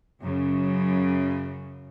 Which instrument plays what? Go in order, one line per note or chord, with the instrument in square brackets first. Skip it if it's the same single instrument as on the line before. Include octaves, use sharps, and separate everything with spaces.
[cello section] F#2 C#3